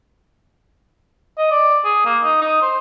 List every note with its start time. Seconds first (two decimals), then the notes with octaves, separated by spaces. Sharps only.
1.38 D#5
1.51 D5
1.84 G#4
2.05 A#3
2.23 D#4
2.41 D#4
2.62 C5